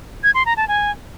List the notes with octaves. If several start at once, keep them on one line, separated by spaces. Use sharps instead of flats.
G#6
C6
A#5
A5
G#5